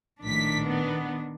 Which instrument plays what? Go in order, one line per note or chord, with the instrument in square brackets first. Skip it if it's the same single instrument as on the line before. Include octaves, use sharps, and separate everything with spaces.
[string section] A#1 A2 B6 [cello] D#3 D4
[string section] B3